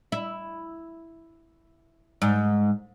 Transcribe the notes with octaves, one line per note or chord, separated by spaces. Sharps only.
E4
G#2